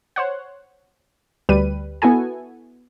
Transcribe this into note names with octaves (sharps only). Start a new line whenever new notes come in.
C5 C#5 F#5
D2 G3 B4 D#7
B3 E4 F#4 A4 G#5